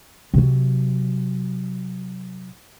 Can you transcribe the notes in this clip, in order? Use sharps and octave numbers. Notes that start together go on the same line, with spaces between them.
C3 F#3